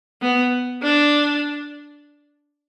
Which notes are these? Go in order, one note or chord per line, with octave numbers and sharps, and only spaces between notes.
B3
D4